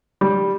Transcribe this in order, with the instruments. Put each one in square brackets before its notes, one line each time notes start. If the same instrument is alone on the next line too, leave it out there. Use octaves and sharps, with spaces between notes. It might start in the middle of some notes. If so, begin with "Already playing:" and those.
[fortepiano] G3